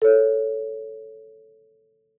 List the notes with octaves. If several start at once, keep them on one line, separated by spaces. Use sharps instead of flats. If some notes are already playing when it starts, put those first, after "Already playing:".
A4 C#5